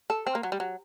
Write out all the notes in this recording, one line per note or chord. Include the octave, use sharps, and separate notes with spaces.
A4
C4
A#3
F#3
G3
F#3